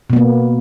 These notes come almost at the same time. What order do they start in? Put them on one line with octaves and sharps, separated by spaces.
B2 B3 A#3